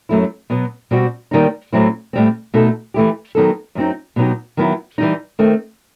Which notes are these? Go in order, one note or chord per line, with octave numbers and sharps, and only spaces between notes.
F#2 F#3 A3 E4
B2 F#3 B3
B2 G3 C4 F#4
D#2 D#3 G3 D#4
A2 F#3 C4 E4
A2 G3 C4
B2 A3 D#4 A4
E3 A3 E4 G4
D#3 F#3 B3 D#4 A4
F#2 F#3 C4 D#4
B2 F#3 B3 D#4 G4
D#3 F#3 B3 E4
E3 G3 D#4
D#3 A3 C4